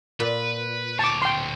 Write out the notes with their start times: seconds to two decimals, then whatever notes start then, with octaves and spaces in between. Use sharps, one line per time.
0.20 A#2 B4
0.99 D2 C#5 A5 D6
1.22 G5 C6